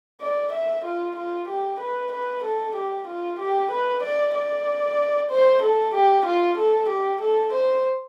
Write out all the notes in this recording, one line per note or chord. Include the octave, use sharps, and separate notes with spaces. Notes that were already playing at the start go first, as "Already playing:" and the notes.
D5
E5
F4
F4
G4
B4
B4
A4
G4
F4
G4
B4
D5
D5
C5
A4
G4
F4
A4
G4
A4
C5